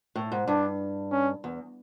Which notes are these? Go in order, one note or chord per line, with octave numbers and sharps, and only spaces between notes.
A2
G#2
G2 D4
C#4
E2